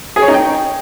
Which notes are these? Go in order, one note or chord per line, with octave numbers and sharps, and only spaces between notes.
G#4
C#5
D#4
G5